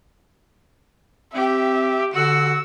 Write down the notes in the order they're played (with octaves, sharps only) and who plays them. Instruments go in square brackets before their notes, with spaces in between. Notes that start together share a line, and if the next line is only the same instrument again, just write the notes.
[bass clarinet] C4 [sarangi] G4 [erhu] E5
[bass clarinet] D3 [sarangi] F#4 [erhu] E6